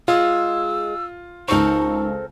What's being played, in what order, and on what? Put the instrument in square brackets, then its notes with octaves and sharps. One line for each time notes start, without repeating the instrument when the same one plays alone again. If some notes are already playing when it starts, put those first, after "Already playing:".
[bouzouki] G#3 G#4 [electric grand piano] F4 [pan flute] E6
[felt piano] C#2 C#6 [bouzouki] C4 A4 A#4 [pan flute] D#4